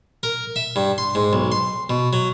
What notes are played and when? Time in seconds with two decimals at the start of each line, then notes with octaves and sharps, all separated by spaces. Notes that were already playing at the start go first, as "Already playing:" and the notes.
0.23 A#4
0.56 E5
0.76 G2
0.98 C6
1.15 G#2
1.33 B1
1.52 C6
1.90 B2
2.13 F#3